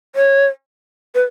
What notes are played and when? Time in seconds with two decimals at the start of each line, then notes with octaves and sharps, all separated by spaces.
0.16 C#5
1.15 B4